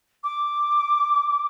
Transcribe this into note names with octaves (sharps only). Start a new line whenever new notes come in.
D6